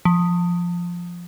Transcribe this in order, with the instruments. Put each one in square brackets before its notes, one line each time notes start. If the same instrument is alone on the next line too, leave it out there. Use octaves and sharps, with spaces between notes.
[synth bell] F3